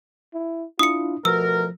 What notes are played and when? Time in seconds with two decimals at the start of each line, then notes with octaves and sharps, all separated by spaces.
0.34 E4
0.79 D4 E4 F4 D#6 C#7
1.25 B2 F3 A3 A#4 E6